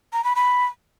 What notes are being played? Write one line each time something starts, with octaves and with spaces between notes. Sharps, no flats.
A#5
B5
B5